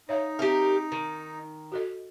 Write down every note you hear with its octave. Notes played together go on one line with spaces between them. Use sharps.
D#4 C#5 E5 F5
C4 G4 A#4 E5
D#3
F#4 A4 D#5